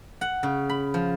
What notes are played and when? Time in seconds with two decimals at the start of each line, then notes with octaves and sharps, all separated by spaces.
0.21 F#5
0.43 C#3
0.69 B5
0.94 F3